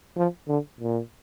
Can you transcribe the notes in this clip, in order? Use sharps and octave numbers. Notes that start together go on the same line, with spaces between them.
F3
D3
A#2